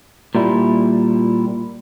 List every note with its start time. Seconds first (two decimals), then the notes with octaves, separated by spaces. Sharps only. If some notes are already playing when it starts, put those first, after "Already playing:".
0.35 A#2 G3 E4